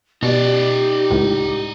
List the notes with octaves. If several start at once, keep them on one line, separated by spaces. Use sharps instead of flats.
B2 D#4 G4 D5
C#2 A2